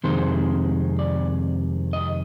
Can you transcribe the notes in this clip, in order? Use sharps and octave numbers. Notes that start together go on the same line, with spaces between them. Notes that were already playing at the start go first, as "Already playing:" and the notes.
F2 C3 D#3 G#3 C5
D5
D#5